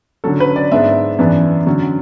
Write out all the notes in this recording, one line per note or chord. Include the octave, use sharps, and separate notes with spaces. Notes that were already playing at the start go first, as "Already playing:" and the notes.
D3 F#3 C#4 A4
B4
D5
G#2 G#3 B3 D4 E5
F#2 E3 B3 D4
D3 F#3 C#4